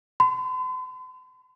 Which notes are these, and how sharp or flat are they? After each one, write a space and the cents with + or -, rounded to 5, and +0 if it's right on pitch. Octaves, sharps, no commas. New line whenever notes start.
C6 -45